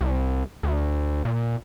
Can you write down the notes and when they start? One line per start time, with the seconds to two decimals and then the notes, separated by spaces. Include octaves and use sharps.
0.01 C2
0.63 D2
1.25 A#2